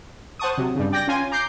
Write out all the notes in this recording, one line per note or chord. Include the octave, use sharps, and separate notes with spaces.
C5 F#5 A5 C#6 D#6
C3 F#3
G2 C#3
D5 G5 G6 A#6
C#4 F4 G#5
A#5 D6 G6 C7